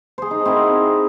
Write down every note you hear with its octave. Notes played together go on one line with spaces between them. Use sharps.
G#4 C5
D#4
C4 E4 F#4 A#4